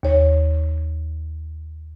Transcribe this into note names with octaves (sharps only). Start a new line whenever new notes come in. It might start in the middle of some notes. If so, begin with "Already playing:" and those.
D#2 C#5